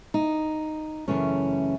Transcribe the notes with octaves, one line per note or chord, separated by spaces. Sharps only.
D#4
F#2 C#3 E3 A3 C#4